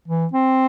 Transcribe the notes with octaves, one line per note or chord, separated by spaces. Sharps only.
E3
C4